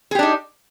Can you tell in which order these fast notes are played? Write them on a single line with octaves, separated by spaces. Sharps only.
G#4 G4 D4 D#4